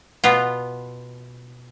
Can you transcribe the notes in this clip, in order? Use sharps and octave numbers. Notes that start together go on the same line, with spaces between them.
B2 B3 F4